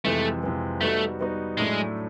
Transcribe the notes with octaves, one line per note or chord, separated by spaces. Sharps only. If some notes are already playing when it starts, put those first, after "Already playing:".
F2 C3 E3 G#3 A3
F2 C3 E3 G#3
G3 A3 B3 D#4 F#4
G3 B3 D#4 F#4
A2 F#3 G#3 A3 D4